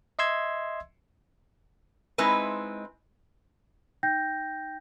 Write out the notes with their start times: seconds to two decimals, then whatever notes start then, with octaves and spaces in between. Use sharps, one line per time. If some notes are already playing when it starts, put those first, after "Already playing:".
0.19 D#5 E5 C6 E6 G#6
2.18 G#3 C4 D#4 E4 B4
4.03 D#4 G5 G6 A#6